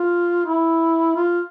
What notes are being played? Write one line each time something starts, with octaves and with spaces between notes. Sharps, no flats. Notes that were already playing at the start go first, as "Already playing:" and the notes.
Already playing: F4
E4
F4